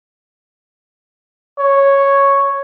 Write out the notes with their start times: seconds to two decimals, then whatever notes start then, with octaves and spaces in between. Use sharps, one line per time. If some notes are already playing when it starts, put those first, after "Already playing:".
1.59 C#5